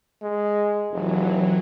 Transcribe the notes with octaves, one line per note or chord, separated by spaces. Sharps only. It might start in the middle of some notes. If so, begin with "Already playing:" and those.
G#3
F1 E3 F#3